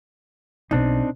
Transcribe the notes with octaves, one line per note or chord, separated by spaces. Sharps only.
B1 C4 D4 D#4